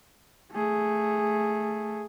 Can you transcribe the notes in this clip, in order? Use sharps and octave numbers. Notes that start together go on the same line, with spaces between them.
A3 G#4